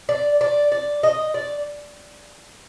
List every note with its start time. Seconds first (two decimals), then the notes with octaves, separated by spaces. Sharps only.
0.09 D5
0.41 D5
0.72 D5
1.03 D#5
1.34 D5